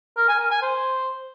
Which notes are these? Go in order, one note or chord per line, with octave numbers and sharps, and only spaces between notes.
A#4
G#5
A#4
G#5
C5